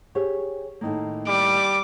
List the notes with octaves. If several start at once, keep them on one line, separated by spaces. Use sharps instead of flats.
G4 G#4 C#5
A2 D#3 A#3
G3 D6